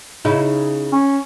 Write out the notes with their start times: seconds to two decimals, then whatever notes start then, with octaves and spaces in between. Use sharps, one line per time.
0.25 C#3 D#4 E4
0.92 C#4